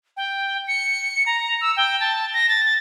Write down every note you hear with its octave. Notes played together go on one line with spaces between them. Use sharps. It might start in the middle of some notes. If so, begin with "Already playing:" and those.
G5
C#7
A#5
E6
G5
A5
A#6
A6